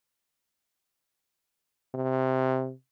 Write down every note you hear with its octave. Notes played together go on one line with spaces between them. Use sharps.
C3